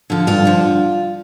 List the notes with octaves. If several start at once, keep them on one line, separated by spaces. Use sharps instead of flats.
D3 F3
G2 F4
D3 F3